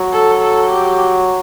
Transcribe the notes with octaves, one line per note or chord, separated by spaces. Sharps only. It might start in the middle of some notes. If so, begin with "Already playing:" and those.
Already playing: F#3
A4
A4
G4